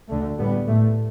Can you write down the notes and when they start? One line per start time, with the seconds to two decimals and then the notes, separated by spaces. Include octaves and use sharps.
0.09 D2 D3 A3
0.38 A2 G3 B3
0.67 A2 A3